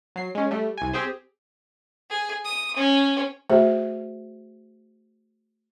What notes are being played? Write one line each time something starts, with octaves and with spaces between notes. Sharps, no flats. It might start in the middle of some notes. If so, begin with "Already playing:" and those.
F#3 C7
G#3 C#4
G3 A3
C2 G#5
C4 G4 G#4 C5
G#4
D#6
C#4
A3 F#4 G#4 C5 E5